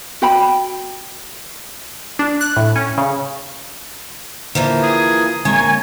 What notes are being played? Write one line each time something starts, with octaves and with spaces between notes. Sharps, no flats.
F#4 G5 B5
D4
F#6
A2
C#4
C#3
D3 E3 F3 A#3
G#4
D3 G#3 A#3 C4 C#5 G#5